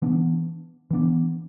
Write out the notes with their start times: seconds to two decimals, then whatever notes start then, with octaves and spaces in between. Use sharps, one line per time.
0.02 E3 B3 D4
0.91 E3 B3 D4